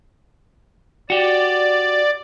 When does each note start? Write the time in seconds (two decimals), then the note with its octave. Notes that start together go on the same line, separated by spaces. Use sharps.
1.10 F#4 G4 D5